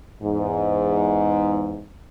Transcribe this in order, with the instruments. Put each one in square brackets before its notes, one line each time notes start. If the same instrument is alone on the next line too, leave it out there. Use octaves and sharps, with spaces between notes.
[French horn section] E2 G#2